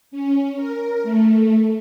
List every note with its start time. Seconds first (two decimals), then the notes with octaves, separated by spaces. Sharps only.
0.11 C#4
0.56 A#4
1.03 A3